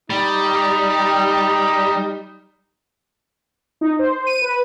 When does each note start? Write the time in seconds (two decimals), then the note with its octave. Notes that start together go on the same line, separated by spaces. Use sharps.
0.10 G3 D#4
3.81 D#4
3.99 C5
4.26 D#7
4.42 B4